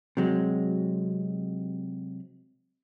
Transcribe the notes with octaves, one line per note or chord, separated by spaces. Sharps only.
C3 F#3 G#3